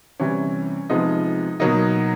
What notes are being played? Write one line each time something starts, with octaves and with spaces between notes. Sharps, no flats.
C3 E3 G3 C#4
C3 F3 G#3 B3 D#4
B2 F#3 A#3 D#4